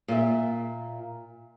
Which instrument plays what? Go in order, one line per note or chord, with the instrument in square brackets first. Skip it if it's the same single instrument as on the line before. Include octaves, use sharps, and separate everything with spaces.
[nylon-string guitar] A#2 F4 E5